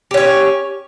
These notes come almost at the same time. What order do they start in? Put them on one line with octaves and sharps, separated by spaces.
G4 C#4 C#5